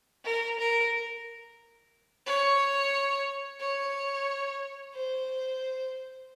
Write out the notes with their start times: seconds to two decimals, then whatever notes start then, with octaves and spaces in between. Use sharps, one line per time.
0.25 A#4
0.59 A#4
2.26 C#5
3.60 C#5
4.95 C5